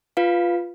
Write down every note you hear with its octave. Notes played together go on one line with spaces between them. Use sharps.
F4 B4 F5